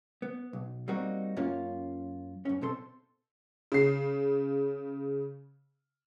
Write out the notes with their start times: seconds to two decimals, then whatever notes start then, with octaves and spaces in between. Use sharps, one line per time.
0.22 B3
0.53 B1
0.88 G3 A#3 C4 D#4 F#4
1.37 F#2 A#3 C#4 F4
2.45 F#2 C#4
2.61 B2 C4 A4 C6
3.72 C#3 C7